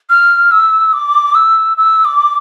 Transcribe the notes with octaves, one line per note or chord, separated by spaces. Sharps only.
F6
E6
D6
E6
E6
D6